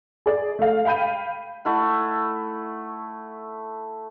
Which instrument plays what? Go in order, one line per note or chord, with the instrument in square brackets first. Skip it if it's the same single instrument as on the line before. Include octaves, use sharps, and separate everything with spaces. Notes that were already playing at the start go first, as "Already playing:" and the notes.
[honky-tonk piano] G#4 D5
A3 F5
F5 G5 B5 G6 D#7
[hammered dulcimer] A3 E4 F#5